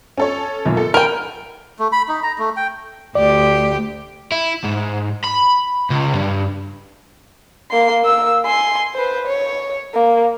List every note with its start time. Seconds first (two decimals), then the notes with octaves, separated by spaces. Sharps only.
0.17 C#4 A4 C#5
0.65 B1 F#2 A#2
0.77 A4
0.94 A#4 G5 G#5 B5
1.79 A3
1.92 B5
2.09 D#4
2.23 A#5
2.39 A3
2.57 G5
3.15 D2 G4 D5
4.32 E4
4.64 G#2
5.24 B5
5.90 C#2
6.15 G2
7.71 A#3 C6
8.03 A#3 E6
8.45 G#5 C6
8.94 B4 C5
9.27 C#5
9.93 A#3